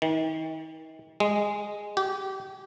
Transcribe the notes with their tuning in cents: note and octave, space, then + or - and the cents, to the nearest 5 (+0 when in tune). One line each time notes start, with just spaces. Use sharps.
D#3 +40
G#3 -10
G4 -30